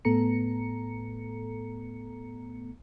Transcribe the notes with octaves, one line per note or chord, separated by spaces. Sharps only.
A2 A3 B3 A4 A#5 C#7